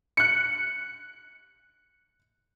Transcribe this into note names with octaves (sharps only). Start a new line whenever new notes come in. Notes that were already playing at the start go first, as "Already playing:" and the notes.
F#6 C#7